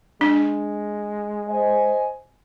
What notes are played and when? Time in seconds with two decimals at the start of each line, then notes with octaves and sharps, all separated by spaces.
0.21 G#3 D4
1.50 C5 D#5 G#5